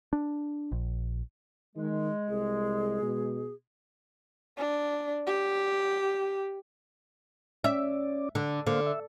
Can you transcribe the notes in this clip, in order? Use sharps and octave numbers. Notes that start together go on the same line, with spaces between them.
D4
A#1
D#3 G#3
C2 G#4
B2
D4
G4
C#4 D5 E5
D3
D3 A#3 C5 F5
E5